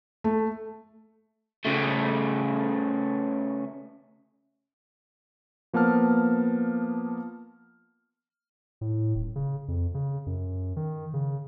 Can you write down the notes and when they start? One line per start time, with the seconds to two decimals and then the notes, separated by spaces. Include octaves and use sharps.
0.24 A3
1.65 C#3 A3
5.73 F3 A#3 B3 A5 F6
8.81 A2
9.15 D#1
9.36 C#3
9.68 F2
9.94 C#3
10.27 F#2
10.76 D#3
11.14 C#3